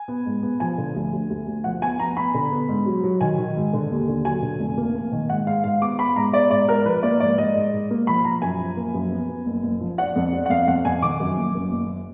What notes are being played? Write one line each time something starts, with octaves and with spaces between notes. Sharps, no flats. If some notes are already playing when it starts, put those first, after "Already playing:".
Already playing: G#5
B3
G#2
B3
F3 G#5
D3
D2
D2
D2
D2
F3 F#5
B3 G#5
B3 A#5
B3 B5
D3
B3
G#2
F#3
F#3
D#3 G#5
D#3
G#2
D3
D#2
D3
F#3 G#5
D3
F1
A#3
A#3
D#3
G#2 F#5
G#2 F5
G#2 F5
B3 D6
B3 B5
G#2 A#5
B3 D5
G#2 D5
G#2 A#4
F3 B4
A#3 D5
G#2 D5
G#2 D#5
G#2
G#2
A#3
F3 B5
F3 A#5
F#2 G#5
F3
A#3
F#2
B3
B3
F#1
F#1
F3
D4 F#5
F2
D4
F#5
F2 F5
F2 F#5
F2 G#5
D#3 D6
F#2
F#1
F#2
F#1